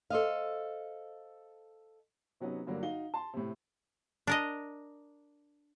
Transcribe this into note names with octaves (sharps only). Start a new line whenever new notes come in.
A4 C5 D#5 F5
C3 F#3 B3 C#4 D#4
G2 D3 F#3 G3 A#3
D#4 F#4 F5 G7
A5 C6
A2 C3
D4 A#4 D#5